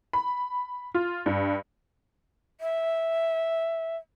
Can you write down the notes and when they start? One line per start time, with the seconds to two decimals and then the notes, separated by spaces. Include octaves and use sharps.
0.13 B5
0.94 F4
1.26 G2
2.60 E5